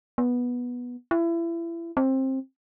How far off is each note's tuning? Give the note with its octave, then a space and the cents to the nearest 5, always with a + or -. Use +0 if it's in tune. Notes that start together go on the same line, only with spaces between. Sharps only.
B3 -10
E4 +30
C4 +20